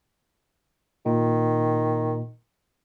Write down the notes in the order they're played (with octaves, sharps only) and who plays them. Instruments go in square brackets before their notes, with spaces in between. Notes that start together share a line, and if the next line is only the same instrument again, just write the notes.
[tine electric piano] A#2 [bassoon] D#3